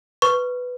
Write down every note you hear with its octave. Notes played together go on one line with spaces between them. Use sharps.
B4 C#6